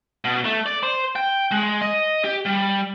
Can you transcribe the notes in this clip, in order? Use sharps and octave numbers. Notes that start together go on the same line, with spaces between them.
B2
A3
D5
C5
G5
G#3
D#5
G4
G3